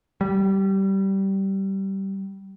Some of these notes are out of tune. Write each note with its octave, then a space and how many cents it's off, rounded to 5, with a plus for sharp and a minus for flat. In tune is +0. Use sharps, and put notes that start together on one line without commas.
G3 -15